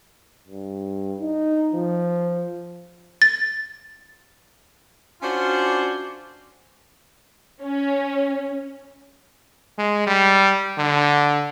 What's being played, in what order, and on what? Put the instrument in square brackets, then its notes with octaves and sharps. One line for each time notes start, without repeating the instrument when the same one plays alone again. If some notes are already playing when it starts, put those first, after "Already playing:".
[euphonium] G2
D#4
F3
[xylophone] A6
[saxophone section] C#4 D4 F4 F#4 C5
[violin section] C#4
[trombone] G#3
G3
D3